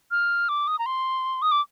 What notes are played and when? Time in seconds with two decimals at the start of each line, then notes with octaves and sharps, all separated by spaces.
0.11 F6
0.49 D6
0.68 D#6
0.79 A#5
0.86 C6
1.42 D#6
1.52 D6